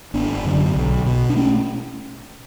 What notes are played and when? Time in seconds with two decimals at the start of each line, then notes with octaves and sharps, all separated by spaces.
0.14 G#1 B3 D4
0.44 F#2 D3
0.75 B1
1.06 B2
1.30 D4
1.36 A3 C#4